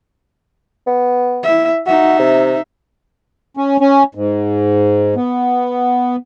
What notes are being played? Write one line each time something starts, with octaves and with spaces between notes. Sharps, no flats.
B3
E4 E5
D#4 F#4 E5
C3
C#4
C#4
G#2
B3